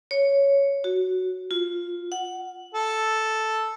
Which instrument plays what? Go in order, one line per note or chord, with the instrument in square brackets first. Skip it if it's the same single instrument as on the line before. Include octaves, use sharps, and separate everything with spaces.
[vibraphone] C#5
F#4
F4
F#5
[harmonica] A4